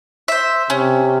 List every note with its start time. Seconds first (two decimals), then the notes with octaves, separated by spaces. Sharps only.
0.28 C5 E5
0.70 C3 C#4